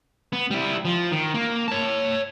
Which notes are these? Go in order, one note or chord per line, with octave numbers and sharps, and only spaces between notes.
B3
G3 E4
F3
D#3
A#3
C#5 A5